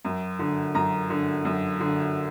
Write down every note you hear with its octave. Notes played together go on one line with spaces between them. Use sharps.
F#2
D3
F#2 A#5
D3
F#2
D3